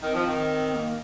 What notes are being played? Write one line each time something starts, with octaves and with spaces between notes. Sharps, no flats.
D#3 C4
F3
D#3
A#3